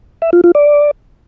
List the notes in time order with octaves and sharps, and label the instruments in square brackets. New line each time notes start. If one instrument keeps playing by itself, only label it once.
[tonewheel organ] E5
F4
F4
D5